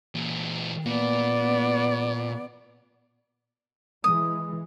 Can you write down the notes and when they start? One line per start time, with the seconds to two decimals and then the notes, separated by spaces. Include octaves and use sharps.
0.15 A#2 E3
0.86 A#2 B3 D5
4.04 E3 G#3 D#6